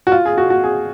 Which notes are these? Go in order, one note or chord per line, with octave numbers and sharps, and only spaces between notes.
F#4
F4
G#4
F#4
F#4
G#4